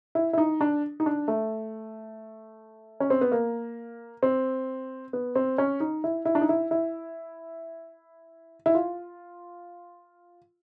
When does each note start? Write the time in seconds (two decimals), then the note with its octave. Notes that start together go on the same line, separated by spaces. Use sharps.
0.15 E4
0.33 E4
0.38 D#4
0.61 D4
1.00 D#4
1.06 D4
1.28 A3
3.00 C#4
3.10 C4
3.21 B3
3.32 A#3
4.23 C4
5.13 B3
5.36 C4
5.58 C#4
5.80 D#4
6.04 E4
6.25 E4
6.35 D4
6.41 D#4
6.49 E4
6.71 E4
8.66 E4
8.75 F4